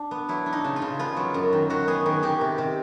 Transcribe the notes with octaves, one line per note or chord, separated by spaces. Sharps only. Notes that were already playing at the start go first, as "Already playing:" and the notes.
Already playing: D4
B3
F#3 E4
D4
D#4
C#3
F4
C#3
B3 F4
F#3
F#2
D#3
D#3 F#4
B3 G#4
D#3
D#3 G4
C3
C3